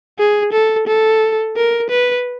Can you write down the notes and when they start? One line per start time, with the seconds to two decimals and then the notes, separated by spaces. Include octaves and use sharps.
0.19 G#4
0.52 A4
0.87 A4
1.57 A#4
1.90 B4